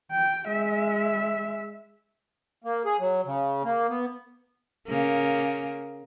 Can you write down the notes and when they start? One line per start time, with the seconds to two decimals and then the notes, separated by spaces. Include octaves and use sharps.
0.12 G5
0.47 G#3 E5
2.64 A#3
2.85 G#4
2.99 F#3
3.26 C#3
3.64 A#3
3.89 B3
4.88 C#3 A#3